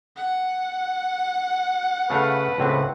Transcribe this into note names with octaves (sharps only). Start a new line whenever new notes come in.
F#5
C#3 A3 B4 F5
C#2 A2 C4